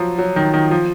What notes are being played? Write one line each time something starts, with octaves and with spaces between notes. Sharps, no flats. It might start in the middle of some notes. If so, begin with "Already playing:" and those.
Already playing: F3 F#3
F#3
D#3
D#3
F3